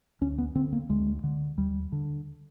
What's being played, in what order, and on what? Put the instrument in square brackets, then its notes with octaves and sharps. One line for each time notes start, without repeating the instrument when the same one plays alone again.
[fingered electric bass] D2 C#4
B3
D3 C4
A#3
D2 G#3
D3
D#2 G3
D3